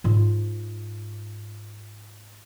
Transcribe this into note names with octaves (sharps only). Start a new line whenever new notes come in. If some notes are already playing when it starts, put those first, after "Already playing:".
G#2 F4